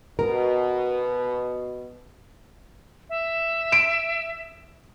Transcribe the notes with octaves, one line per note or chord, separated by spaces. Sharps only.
B2 A#4
E5
D7